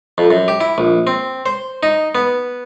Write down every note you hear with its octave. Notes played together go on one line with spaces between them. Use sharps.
F2
F#2
G4
E4
A#1
C4
C5
D#4
B3